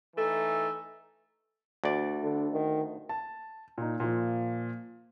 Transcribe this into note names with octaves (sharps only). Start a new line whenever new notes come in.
E3 A3 D#4
D2 D5
D3
D#3
A5
A#2 D#4
A#2 F3